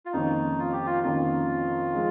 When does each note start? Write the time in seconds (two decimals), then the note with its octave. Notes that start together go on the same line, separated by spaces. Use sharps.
0.06 F4
0.13 F2 D#3 A#3 C#4 D#4
0.59 F4
0.73 G4
0.86 F4
1.03 F2 D#3 A#3 C#4 F4
1.95 F3 G#3